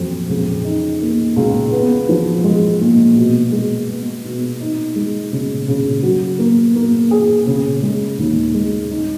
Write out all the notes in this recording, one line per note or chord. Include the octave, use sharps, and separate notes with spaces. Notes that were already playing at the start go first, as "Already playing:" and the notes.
Already playing: F2 F#3
C#2
D#4
A#3
C#2
B3
F3
G#3
A#2
B2
G#3
B3
B2
D#4
G#3
C#3
C#3
F#3
A#3
A#3
G#4
C#3
G#3
D#2
G#3
D#4